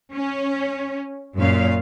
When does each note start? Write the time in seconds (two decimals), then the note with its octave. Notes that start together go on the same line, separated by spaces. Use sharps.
0.12 C#4
1.36 F#2 A#2 C#4 F5